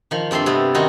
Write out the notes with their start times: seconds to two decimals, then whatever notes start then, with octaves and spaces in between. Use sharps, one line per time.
0.11 D#3 F3
0.31 G2 C4 A4 E5 C6
0.46 C3 B3
0.75 D#3 C4 C#4 D#4 F#4